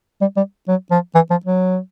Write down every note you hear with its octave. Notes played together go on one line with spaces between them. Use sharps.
G3
G3
F#3
F3
E3
F3
F#3